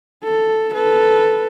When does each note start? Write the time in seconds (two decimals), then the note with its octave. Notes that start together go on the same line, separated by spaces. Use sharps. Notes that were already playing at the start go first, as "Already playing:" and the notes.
0.24 A4
0.74 A4 B4